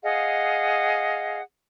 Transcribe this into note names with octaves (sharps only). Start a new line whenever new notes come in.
G#4 D#5 F5 F#5